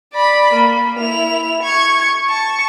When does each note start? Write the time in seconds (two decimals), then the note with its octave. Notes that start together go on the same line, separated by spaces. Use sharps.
0.14 D5 B5
0.53 A#3
1.00 E4 F7
1.63 C#6 G#6
2.28 A5 C#6